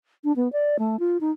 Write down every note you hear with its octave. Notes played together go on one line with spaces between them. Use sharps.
D4
B3
D5
A3
F4
D#4